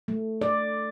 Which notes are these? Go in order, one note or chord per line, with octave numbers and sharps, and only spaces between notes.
A3
D5